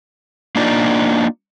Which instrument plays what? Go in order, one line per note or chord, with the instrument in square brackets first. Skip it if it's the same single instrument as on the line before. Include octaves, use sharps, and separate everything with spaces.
[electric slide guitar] A#3 D4 D#4 F4 D5